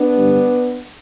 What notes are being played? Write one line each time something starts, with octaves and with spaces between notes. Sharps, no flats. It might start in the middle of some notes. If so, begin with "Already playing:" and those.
Already playing: B3 D4
G2 D3 G3